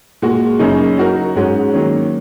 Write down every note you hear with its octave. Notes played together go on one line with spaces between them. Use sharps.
A#2 G#3 F#4
F#2 C#3 A#3 D#4
F#3 D#4 F#4 A#4
G#2 G#3 C#4 F#4
D#3 F#3 A#3 C#4